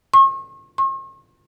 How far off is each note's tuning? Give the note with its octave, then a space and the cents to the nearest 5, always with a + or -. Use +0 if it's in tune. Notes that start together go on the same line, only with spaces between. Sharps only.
C#6 -40
C#6 -45